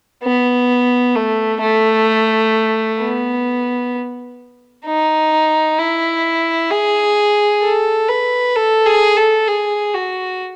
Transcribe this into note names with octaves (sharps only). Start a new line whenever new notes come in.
B3
A3
A3
B3
D#4
E4
G#4
A4
B4
A4
G#4
A4
G#4
F#4